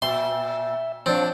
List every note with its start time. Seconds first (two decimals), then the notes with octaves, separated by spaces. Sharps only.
0.02 A#2 E5 C6
1.06 F3 C4 D4 C#5 A5